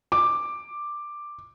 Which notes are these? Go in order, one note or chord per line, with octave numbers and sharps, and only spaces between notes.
D6